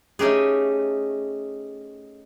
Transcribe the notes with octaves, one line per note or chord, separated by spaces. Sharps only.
A3 C#4 D#4 G4 G#4